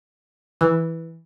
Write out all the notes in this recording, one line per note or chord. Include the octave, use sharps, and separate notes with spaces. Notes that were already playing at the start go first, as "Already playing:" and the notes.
E3